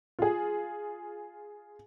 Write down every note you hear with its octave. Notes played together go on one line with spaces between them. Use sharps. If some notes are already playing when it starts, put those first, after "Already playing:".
F4 G#4